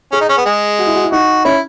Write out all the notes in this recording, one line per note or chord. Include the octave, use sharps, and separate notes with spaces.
C#4 G#4
D#4
C#4
B3
G#3
F#4
E4
F#4
E4
D#4 F#4
C#4 E4